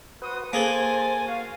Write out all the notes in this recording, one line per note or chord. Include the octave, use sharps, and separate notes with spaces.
F#4 B4 C5 F#5 D#6
A#3 G#4 A4 C5 G#5 A6
F#4 F5